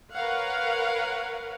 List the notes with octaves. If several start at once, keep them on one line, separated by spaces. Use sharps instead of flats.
A#4 B4 C#5 F5 F#5